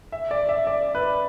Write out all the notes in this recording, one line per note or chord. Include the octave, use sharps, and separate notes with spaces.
E5
D5
E5
D5
B4